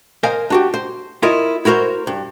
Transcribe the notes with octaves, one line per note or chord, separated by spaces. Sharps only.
A#4 C5 D#5 F5 G#5
D4 F#4 G4
C5
E4 F4 A#4 C#5 D#5
E4 F#4 A#4 C5 C#5
G2